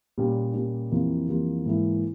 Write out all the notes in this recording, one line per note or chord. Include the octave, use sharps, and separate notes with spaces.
A#2 G3 A#3 C#4
A#2 G3 A#3 C#4
F2 E3 G3 A#3 F4
F2 E3 G3 A#3 F4
G#2 E3 A#3 E4